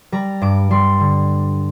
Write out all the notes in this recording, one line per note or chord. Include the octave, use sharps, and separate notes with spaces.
G3 A#5
G2 D6
G3 C6
D3